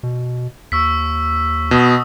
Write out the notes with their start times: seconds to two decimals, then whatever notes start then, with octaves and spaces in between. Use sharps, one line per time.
0.03 B2
0.72 D#2 C#6 E6 B6
1.71 B2 D#6